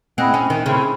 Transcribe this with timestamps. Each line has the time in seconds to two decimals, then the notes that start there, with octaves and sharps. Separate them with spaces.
0.18 C4 E4 G#4 D#5 F#5
0.34 C#4
0.50 D#3
0.66 C#3 A3 C4 E4